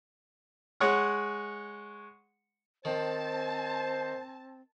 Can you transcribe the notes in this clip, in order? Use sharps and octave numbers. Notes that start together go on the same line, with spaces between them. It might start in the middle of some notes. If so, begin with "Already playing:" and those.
G#3 C#5 F#5
D#3 C4 C5 A5